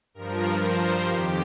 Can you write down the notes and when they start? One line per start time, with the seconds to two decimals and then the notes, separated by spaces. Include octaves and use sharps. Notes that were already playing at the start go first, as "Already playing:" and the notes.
0.14 G2 F3 A#4
0.62 C5
1.10 F2 D#3 G4